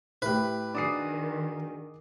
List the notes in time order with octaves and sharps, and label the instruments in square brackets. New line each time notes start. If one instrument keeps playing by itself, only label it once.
[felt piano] A2 G4 [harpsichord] B4
[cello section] D#3 [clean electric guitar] D4 F#4 G#4 [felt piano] D6 D#6 C7